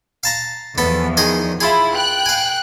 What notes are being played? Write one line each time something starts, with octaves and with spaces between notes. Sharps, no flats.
F5 A5 A#5
E2 F3 B3 A4
D#3 G#4 D#5
E4 F4 G#4
G5 F#6
F5 G#5